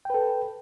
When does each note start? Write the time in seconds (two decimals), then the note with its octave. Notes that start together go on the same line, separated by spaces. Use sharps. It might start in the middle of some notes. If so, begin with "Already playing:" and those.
0.05 G5
0.10 B4
0.14 A4